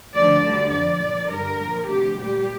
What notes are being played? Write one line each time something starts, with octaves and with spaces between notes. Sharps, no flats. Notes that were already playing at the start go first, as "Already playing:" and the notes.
D2 D3 F3 D5
D2 D3 G3
F2 F3 D5
A#2 F3
G2 D3 G3 A#4
A#2 F3
D2 C3 F3 G4
A#2 G3 G4